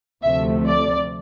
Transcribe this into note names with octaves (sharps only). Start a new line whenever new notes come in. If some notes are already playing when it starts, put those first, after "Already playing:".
D2 C3 F3 A3 E5
D5